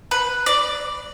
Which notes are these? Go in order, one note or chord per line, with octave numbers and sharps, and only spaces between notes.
B4
D5